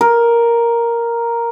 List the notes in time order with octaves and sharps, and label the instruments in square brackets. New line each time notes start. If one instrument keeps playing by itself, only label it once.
[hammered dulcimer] A#4